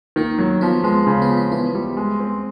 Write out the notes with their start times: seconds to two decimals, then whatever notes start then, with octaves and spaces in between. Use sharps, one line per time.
0.16 D#3 A#3
0.39 F#3
0.61 F3 B3
0.84 G#3 B3
1.07 C#3
1.22 B3
1.29 F3
1.37 B3
1.51 E3 B3
1.75 G3
1.97 G#3
2.20 C4